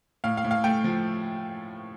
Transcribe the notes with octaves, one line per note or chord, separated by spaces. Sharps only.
A2 F5
F5
A2
F5
A3 G5
F3